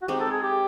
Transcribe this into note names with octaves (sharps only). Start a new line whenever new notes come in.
F#4
G#3 C4 D#4 G4
A4
G#4
G4